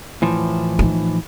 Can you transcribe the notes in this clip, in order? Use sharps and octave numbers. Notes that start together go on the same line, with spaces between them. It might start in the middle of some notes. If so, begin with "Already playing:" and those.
A2 E3 F3
D#4